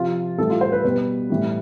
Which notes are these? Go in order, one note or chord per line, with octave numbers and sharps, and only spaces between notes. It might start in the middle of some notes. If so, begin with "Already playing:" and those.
Already playing: C3 F3 F4
A2 E3 G3 A4
F4
C5
B4
B2 G3 B4
A2 E3 G3